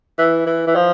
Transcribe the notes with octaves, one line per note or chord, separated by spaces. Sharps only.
E3
E3
E3
F3